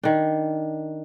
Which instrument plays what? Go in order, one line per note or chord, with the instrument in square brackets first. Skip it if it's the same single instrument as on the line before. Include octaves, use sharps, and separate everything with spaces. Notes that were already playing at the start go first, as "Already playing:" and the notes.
[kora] D#3 D4